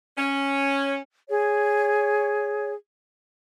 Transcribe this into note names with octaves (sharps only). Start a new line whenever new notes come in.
C#4
G#4 C#5